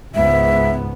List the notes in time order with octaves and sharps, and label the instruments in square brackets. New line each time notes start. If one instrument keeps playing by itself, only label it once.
[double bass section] C#2 G#2 B3 [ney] E5